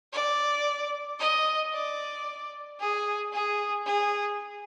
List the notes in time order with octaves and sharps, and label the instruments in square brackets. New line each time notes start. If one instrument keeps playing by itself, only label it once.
[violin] D5
D#5
D5
G#4
G#4
G#4